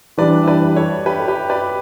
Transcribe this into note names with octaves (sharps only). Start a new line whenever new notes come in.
E3 G3 D4 B4 D5
E5
B4 D5
A4 C#5
G4 B4
A4
G4 B4
B4 D5